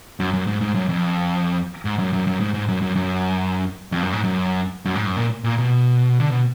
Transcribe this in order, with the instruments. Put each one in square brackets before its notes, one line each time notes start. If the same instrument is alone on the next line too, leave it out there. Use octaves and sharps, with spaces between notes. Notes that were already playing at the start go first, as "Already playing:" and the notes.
[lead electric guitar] F#2
F#2
G#2
G#2
F#2
F2
G#2
F#2
F#2
F#2
G#2
G#2
F#2
F#2
F#2
F2
F#2
G#2
F#2
F#2
G#2
F#2
A#2
A#2
B2
D3
B2